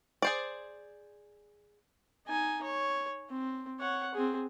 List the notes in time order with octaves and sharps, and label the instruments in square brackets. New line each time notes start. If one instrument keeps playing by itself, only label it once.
[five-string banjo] G#4 C5 D5
[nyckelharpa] D#4 G#5
C#5
C4
C#5 F#5
C4 G#4